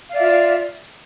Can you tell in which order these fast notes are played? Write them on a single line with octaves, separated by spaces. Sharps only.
F5 D5 E5 F4